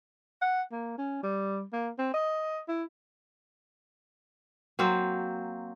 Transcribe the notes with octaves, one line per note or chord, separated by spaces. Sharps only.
F#5
A#3
C#4
G3
A#3
C4
D#5
E4
F#3 A#3 C4